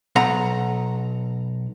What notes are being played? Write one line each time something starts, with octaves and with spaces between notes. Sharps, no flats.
B1 F#5 A#5 B5